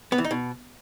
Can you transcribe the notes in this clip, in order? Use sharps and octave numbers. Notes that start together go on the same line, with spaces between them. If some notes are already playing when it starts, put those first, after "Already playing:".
B3
E3
D#4
B2